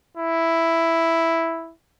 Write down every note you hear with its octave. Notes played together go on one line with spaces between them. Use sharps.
E4